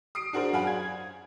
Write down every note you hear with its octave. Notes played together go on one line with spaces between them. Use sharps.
D#6 C7 D7
D4 F#4 G#4 A#4 C5
F#2 F5 F#5 G#5 B5
G#6